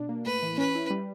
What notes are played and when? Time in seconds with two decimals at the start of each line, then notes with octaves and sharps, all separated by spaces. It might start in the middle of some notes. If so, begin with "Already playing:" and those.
Already playing: B2 D4
0.09 A#3
0.25 A2 B4
0.43 E3
0.58 C#4 B4
0.75 E4
0.90 G3